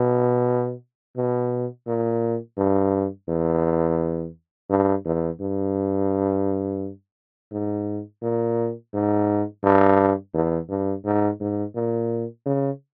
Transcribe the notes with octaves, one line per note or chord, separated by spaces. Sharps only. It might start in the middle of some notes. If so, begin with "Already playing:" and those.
Already playing: B2
B2
A#2
G2
E2
G2
E2
G2
G#2
A#2
G#2
G2
E2
G2
G#2
G#2
A#2
C#3